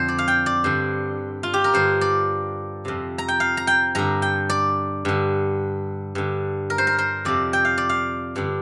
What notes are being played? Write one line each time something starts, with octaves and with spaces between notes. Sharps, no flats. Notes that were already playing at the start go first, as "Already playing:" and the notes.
Already playing: F2 D3 C5
D5
F5
G5
D5
G2 D3 C5
F4
G4
A#4
G2 D3 C5
D5
F2 C3
A#5
G5
F5
A#5
G5
G2 D3 A#5
G5
D5
G2 D3
G2 D3
A#4
C5
A#4
C5
F2 C3 D5
G5
F5
D5
F5
G2 D3